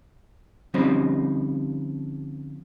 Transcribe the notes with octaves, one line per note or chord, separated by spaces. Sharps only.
D3 F3 G3 C4 C#4 D#4